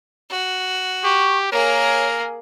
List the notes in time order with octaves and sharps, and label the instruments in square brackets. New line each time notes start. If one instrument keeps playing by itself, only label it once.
[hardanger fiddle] F#4
[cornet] G4 [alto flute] C#6
[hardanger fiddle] A#3 G#4 [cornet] A#4 [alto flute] C#5